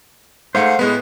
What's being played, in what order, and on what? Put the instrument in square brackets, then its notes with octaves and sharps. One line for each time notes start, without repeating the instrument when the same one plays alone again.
[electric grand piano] G#2 A3 [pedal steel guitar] C5 F5 F#5
[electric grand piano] A2 G#3 B3 [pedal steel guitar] B4 F#6